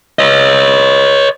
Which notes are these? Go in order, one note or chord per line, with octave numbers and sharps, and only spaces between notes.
C#5 D#5